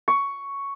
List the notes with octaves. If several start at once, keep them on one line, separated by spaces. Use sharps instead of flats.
C#6